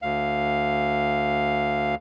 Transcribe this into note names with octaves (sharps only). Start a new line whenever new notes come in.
D2 F5